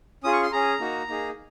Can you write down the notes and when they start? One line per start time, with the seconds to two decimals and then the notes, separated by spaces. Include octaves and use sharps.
0.24 C#4 F4 G#4 D#6
0.33 C#6
0.43 C6
0.52 C#4 G#4 A#5
0.80 A#3 D#4 F#4
1.08 A#3 D#4 G#4